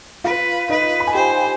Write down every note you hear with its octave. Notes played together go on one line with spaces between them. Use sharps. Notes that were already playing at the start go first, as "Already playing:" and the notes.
F4 B4 F5
D#4 B4 D#5
B5
G#5
G4 C5 G5